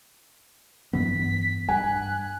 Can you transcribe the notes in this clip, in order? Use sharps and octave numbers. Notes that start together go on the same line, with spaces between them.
G2 E3 B3 B6
G2 G#5 F#6